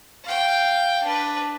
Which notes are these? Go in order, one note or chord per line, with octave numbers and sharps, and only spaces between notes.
F5 G5
D4 B4